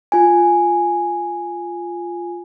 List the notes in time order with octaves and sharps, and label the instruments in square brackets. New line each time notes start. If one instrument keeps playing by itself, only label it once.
[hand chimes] F4 G#5